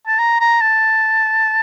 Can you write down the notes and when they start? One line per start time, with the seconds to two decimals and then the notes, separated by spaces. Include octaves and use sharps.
0.07 A5
0.18 A#5
0.40 A#5
0.61 A5